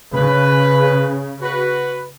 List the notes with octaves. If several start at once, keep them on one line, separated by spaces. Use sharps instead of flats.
C#3 B4
F#4 B4